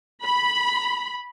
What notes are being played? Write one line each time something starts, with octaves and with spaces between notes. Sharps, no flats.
B5